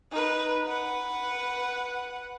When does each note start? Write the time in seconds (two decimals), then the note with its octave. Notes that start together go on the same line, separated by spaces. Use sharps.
0.12 D#4 B4
0.65 B4 F#5